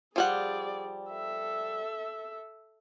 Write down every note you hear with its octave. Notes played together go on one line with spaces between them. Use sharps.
F3 G3 G#4 D5 F#5
A4 E5